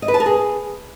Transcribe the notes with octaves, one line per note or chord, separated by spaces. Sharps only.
D#5
B4
A5
A#4
G#4